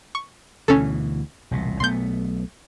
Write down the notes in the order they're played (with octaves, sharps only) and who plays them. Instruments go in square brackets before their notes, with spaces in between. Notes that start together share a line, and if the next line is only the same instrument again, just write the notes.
[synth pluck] C#6
[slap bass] D2 B2 E3 [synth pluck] C#4 A4
[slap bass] E1 C2 A#2
[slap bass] B1 A3 B3 [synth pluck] C6 G6